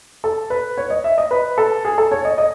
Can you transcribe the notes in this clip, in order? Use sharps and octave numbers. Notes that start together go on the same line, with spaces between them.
A4
B4
C#5
D#5
E5
D#5
B4
A4
G#4
A4
C#5
D#5
D#5